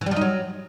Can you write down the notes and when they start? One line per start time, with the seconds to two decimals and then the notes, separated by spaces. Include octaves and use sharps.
0.01 E3
0.06 G3
0.11 F3
0.16 D#4
0.21 F#3